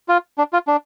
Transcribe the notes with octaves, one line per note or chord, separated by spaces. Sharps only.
F4
D4
F4
D4